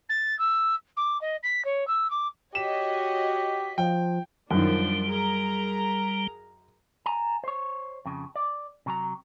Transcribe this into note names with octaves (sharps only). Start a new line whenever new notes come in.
A6
E6
D6
D#5
B6
C#5
E6
D6
F#4 G4 C#5 D#5 B6 E7
F3 G5
F#2 D#3 F3 G3 D4
G#4 A#4 A#5
G#5 A#5
C5 C#5
F2 C#3
D5
C3 F#3 A#5